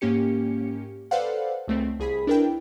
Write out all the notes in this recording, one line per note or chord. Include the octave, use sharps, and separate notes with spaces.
G#2 A#3 C#4 G4 C#7
A4 B4 C5 D5 F5 F#5
C#2 A3 C4
C2 G#4 B5 B6
D4 E4 A#4 B4 G5